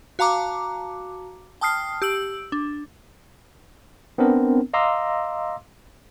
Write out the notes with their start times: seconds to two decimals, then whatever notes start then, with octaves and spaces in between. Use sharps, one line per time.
0.19 F#4 F5 A5 A#5 D6
1.61 G5 A5 D#6 F6 C7
2.02 G4 E6 D7 F#7
2.52 D4
4.18 B3 C4 D4 A#4
4.74 D#5 F5 A#5 C6 D6 E6